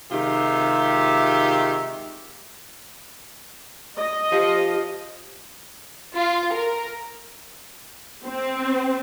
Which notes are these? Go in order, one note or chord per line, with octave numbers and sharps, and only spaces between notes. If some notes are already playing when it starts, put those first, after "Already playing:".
C3 D#3 G#3 F4 G4 E5
D#5
F4 G4 C5 F5
F4
A#4
C4